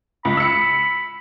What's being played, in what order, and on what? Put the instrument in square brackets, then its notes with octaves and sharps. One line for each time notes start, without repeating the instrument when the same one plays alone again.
[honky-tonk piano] C#2 [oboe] B5
[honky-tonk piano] E6 C#7